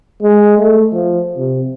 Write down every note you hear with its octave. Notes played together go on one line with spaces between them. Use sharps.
G#3
A3
F3
C3